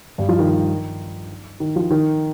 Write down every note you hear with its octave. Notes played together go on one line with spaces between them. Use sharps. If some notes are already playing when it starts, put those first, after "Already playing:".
G2 G3
F3
D#3
D#3
F3
D#3